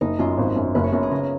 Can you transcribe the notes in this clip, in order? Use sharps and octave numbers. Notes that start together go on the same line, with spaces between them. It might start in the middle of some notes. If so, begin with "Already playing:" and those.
F#1 D#4
F#2 F4
G#1
F#2
F#1 B4
C#5
F#2 A#4
G#4
C#3 A#4